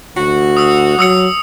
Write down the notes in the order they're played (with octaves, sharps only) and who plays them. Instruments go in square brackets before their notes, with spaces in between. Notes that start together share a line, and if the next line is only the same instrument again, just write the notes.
[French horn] D2 [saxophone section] F#4
[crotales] D#6 E6
[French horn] F#3 [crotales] D#6 E6 C#7